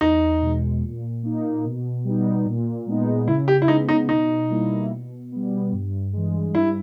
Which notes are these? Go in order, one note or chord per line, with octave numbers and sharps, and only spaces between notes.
E2 D#4
B2 G#3
A#2
A#3 D#4
B2
G3 B3 D#4
A#2
G#3 B3 D#4
C#3 E4
G4
E4
G#3 B3 D#4
D#4
B2 D#4
G3 A#3 E4
B2
G3 B3
G2
E3 G#3
G2 E4